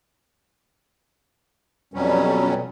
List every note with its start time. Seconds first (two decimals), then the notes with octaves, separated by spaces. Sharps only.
1.94 F2 B2 F#3 G3 C#4